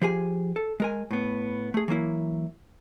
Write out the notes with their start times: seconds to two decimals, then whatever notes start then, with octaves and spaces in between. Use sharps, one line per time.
0.02 F3 G4 G#4 G#5
0.56 A4
0.80 G#3 A#4 G#5
1.11 A2 B3
1.74 A3 G#4
1.88 E3 F#3 A#3 E4